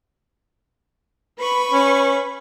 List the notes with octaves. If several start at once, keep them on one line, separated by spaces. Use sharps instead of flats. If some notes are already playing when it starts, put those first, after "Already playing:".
B4 B5 C#6
C#4